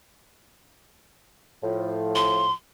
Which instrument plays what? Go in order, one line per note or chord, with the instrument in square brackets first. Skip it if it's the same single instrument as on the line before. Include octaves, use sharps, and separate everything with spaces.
[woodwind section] A2 F3
[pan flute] C6